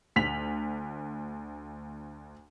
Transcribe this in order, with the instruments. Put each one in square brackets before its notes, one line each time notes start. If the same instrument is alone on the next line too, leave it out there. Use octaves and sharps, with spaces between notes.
[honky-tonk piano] D2 B6 F7 F#7